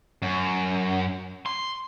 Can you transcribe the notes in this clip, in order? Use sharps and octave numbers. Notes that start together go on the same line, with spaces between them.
F#2
C6